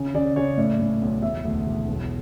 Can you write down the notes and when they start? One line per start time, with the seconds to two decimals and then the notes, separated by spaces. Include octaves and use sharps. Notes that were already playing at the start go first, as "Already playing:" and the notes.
Already playing: C#3
0.14 C#3 D5
0.36 C#3 C#5
0.57 A2 D5
0.79 A2
1.01 B1
1.22 E1 E5
1.45 D2
1.66 E1
1.87 B1